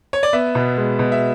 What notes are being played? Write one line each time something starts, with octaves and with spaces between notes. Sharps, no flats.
C#5
D5
B3 E5
B2
G#3
B2
E5